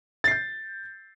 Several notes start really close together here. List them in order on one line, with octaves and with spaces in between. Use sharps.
A6 C7 G6